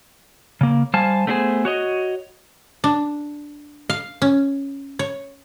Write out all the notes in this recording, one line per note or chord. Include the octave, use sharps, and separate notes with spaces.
C#3 A#3
G3 C5 F5 G#5 A5
A3 B3 D4 G#4 C5 G#5
F#4 C#5 D#5
D4
F5
C#4
C#5